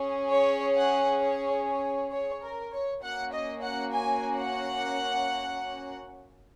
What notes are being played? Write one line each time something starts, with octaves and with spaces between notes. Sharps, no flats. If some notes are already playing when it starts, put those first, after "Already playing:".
Already playing: C#4 G#4
C#5
F#5
C#5
C#5
C#5
A#4
C#5
A#3 C#4 F#4 F#5
D#5
F#5
G#5
F#5